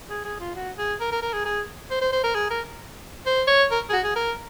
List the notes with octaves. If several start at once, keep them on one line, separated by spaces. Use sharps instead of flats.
G#4
G#4
F4
F#4
G#4
A#4
A#4
A#4
G#4
G#4
C5
C5
C5
A#4
G#4
A#4
C5
C#5
A#4
G#4
F#4
G#4
A#4